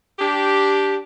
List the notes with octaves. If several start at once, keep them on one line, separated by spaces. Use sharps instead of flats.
D4 G4